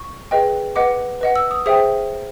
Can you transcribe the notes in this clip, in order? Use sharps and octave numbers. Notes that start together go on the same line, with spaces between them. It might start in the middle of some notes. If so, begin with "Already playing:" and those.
Already playing: C#6
G#4 B4 D#5 G5
B4 D#5 F#5 D6
B4 D#5 F#5
E6
D#6
G#4 C5 E5 G5 D#6